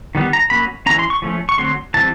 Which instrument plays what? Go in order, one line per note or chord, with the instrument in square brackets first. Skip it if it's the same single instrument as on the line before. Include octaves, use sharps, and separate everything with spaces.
[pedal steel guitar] D#3 G3 B3
A#5
F#3 A#3 C#4 B5
E3 G#3 C#4 A#5
C6
C#6
F3 A3 C#4
C#6
D3 F#3 A3 C4 C6
E3 G3 C4 A5